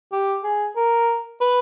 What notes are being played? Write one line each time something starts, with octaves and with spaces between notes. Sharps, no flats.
G4
G#4
A#4
B4